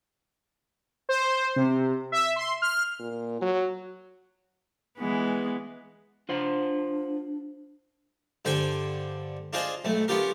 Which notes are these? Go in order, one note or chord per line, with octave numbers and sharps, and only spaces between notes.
C5
C3
E5
C6
F6
A#2
F#3
E3 G#3 B3
D4 F4 C5 F#5
G2 D3 C5 G5 G#5
D4 F4 G#4 C5 D#5
B1 A3
B3 C#4 F4 G4 A#4